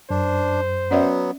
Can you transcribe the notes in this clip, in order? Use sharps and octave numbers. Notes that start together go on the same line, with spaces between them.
F#2 D4 C5
F#3 B3 C#4 D5 E5